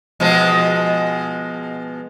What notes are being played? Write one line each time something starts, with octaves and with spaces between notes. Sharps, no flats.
B2 F3 G#3